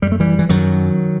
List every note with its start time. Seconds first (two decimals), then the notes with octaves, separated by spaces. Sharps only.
0.02 F#2 G3
0.12 A3
0.20 E3 G3
0.39 E3
0.49 F#2 D#3 F#3